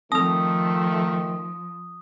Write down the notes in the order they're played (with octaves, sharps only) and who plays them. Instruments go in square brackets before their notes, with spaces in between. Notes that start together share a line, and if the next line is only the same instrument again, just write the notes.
[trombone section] D#3 A3 [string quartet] F3 [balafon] C4 A4 [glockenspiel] D#6